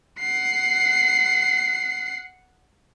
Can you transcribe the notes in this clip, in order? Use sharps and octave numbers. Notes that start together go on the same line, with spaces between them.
F#5 C7